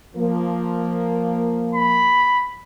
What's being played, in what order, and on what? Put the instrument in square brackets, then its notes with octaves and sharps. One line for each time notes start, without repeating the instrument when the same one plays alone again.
[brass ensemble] F3 A#3
[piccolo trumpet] B5